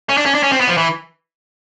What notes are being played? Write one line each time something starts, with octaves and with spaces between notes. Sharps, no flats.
C#4
D4
C#4
D4
C#4
C4
B3
F3
E3